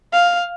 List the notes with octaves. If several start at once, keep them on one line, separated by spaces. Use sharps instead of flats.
F5